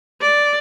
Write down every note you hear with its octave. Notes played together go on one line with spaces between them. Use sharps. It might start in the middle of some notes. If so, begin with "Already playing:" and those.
D5